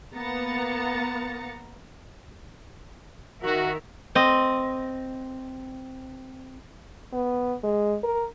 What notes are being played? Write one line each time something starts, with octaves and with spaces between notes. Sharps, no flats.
A#3 B3 A#5 A6 C#7
D#3 F#4 A#4 E5
C4 D#5
B3
G#3
A#4